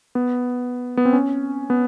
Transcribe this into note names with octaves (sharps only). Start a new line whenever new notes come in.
B3
B3
C4
C#4
B3